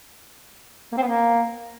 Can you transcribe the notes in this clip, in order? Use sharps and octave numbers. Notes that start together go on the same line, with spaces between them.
A#3
C4
B3
A#3